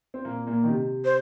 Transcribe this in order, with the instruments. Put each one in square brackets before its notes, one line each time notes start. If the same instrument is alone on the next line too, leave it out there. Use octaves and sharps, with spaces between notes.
[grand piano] C4
A#2 A#3
A#2 A#3
D#3
C3
[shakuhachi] C5